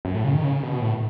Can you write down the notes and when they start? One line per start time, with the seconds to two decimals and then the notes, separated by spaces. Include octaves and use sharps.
0.05 F#2
0.14 A2
0.24 C#3
0.34 D#3
0.44 C#3
0.63 B2
0.82 A2